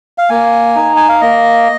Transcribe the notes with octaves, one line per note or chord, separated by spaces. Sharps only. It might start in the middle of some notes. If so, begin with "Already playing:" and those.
F5
A#3 G#5
D#4
G#5
F5
A#3 D#5